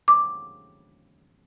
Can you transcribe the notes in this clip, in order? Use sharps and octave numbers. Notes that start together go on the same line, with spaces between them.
D6